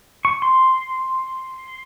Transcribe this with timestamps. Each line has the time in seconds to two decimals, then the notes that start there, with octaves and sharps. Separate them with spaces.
0.25 C#6
0.42 C6